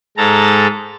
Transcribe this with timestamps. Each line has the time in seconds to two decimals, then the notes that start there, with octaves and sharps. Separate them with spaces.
0.17 G#2 G#3 A4 A#5 A6